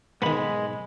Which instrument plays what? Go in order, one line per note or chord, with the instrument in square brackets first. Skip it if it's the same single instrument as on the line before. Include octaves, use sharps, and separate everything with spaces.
[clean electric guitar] B1 G#2 B5 [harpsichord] D#3 B3 [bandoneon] G#3